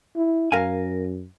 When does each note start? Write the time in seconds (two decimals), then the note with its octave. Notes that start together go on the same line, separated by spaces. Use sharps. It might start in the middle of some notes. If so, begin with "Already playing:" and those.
0.16 E4
0.52 F#2 A#4 F5 G#5